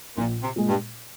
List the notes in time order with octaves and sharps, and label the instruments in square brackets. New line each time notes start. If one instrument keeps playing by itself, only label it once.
[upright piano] A#1 [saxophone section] A#2
[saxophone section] C3
[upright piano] A#2 G#3
[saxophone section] G2